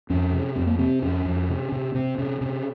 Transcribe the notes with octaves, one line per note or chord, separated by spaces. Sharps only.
F2 C#4
C3
F2 C4
A#3
C3 C4
F2 C#4
F2
C3
C3
C3 C4
C3 C#4
C3 C#4